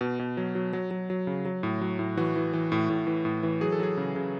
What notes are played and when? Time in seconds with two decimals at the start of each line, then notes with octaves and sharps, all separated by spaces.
0.01 B2
0.19 B2
0.37 F#3
0.55 F#3
0.73 F#3
0.91 F#3
1.10 F#3
1.27 C#3
1.45 F#3
1.63 A2
1.81 F#3
1.99 A2
2.17 E3 F#4
2.36 E3
2.53 E3
2.72 A2
2.90 A2
3.07 E3
3.25 A2
3.43 E3
3.61 F#3 G#4
3.72 A4
3.80 F#3 G#4
3.97 C#3
4.16 C#3